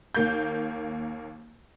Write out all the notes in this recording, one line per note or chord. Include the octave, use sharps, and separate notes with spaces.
D#2 A#3 G6